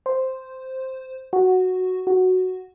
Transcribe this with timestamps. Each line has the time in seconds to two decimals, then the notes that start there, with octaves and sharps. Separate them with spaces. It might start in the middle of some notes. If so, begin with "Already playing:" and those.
0.06 C5
1.33 F#4
2.07 F#4